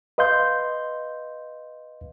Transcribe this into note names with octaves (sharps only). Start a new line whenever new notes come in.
B4 D#5 F5 C6 G6